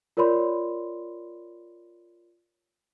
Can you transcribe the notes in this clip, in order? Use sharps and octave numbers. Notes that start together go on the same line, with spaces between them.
F4 A#4 C#5 D5 B5 C6